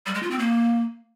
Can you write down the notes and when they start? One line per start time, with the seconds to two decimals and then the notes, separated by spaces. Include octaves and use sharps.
0.06 G3
0.14 G#3
0.23 F4
0.31 C4
0.39 A#3